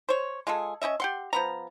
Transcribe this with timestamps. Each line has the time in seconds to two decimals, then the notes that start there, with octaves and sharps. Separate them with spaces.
0.09 C5 C#5
0.47 G#3 F4 G#4 A4
0.82 C#4 E4 D#5 E5
1.00 G4 F#5 C6
1.33 F3 B3 A#5